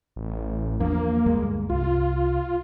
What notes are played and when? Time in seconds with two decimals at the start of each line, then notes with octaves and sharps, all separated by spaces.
0.16 A1
0.80 E2 F3 A#3 D4
1.26 D2 G2 G#3
1.69 C2 F4